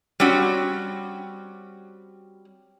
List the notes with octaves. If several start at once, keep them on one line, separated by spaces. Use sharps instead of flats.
G3 C4 C#4 F#4